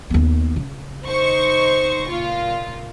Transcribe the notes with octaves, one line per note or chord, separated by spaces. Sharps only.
D#2 B3
C#3
D#4 C5 C#6
A#2 F4